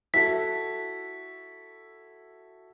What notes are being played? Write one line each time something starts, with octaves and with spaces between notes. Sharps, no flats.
E4 F#4 A4 B6